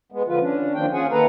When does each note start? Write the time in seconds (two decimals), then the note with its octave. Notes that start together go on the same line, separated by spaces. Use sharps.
0.12 G#3 B3
0.28 D3 F3 F4 B4
0.40 C#4 D4
0.75 D#3 F3 A#3 C4 D4 G5
0.93 C#4 F4 G#4 F#5 G#5
1.12 D#3 A#3 A4 B4 F#5 A#5